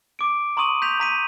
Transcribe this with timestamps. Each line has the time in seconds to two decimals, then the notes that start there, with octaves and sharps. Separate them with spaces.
0.19 D6 D7
0.57 A#5 C6 C#6 D#6 D#7 F#7
0.82 G6 B6 F7
1.00 A#5 B6 D#7